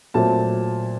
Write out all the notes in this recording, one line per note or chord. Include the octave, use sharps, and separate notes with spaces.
A#2 F#3 A3 C4 A5